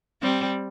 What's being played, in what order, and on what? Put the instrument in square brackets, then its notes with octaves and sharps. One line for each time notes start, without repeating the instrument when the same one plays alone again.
[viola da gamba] G3 C4